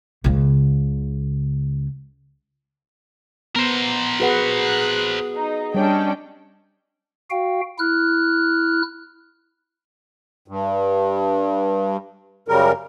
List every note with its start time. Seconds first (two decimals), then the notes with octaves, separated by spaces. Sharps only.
0.24 C#2 C#3
3.56 B3 A#4 C5
4.20 F#4 G#4 B4 F#5
4.60 F#6
5.36 D#4
5.74 G3 C#4 D4 C#5 D#5 G5
7.30 F#4 F5 G5
7.79 E4 F6 F#6
10.48 G2
12.48 F#2 C#3 G3 A#4